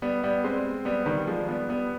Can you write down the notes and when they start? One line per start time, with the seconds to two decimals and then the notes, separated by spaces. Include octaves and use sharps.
0.02 G3 B3
0.24 G3 B3
0.44 G#3 C4
0.85 G3 B3
1.06 D#3 G3
1.27 F3 G#3
1.48 G3 B3
1.69 G3 B3